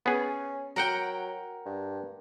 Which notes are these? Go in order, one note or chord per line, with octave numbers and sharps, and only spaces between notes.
B3 C#4 G#4
F#3 A#4 F#5 G5
G2